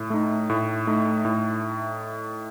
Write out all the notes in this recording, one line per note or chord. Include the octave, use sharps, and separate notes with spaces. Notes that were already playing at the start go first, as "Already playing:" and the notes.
Already playing: A2
A3 D#4
A2
A3 D#4
A2